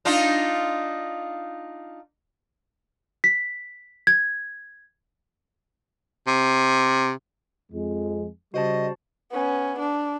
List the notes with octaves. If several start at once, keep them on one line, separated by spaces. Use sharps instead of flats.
D4 D#4 F4
B6
G#6
C3
F2 G#3
C#3 G3 F#4 C5 D#5 A5
B3 C#4
D4